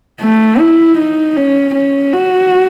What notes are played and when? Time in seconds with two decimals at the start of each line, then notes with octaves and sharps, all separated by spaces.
0.21 A3
0.59 E4
0.98 D#4
1.37 C#4
1.75 C#4
2.14 F#4